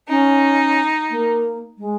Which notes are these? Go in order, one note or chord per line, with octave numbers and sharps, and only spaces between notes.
C#4 D#4
A#3
G#3